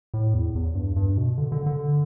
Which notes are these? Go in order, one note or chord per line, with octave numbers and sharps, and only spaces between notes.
A2
E2
E2
G2
G2
B2
D3
D3
D3